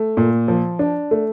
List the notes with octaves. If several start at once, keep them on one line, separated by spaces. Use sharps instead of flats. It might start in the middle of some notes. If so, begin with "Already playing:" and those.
Already playing: A3
A#2
F3
D4
A3